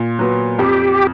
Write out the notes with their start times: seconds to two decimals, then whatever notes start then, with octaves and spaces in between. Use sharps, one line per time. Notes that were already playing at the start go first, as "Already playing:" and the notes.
Already playing: A#2
0.19 F#3 B3
0.59 F2 G4